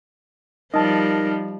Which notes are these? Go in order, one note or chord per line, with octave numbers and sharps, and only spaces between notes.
F3 G3 D#4 A#4 D#5 A5